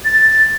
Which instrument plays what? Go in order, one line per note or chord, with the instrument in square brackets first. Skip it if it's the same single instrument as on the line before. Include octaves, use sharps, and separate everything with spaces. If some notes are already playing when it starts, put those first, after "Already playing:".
[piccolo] A6